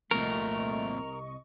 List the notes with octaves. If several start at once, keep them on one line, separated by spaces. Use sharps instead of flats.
C2 F2 A#2 A3 A#4 D#5 C#6